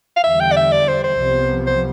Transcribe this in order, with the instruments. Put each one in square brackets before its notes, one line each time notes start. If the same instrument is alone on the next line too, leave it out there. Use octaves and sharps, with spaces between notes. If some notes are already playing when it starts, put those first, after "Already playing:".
[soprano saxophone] F5
[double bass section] E2 D3 G3 [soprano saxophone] E5
[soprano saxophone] G5
D5
E5
D5
C5
C5
[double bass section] C2 C3 F3 B3
[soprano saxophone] C5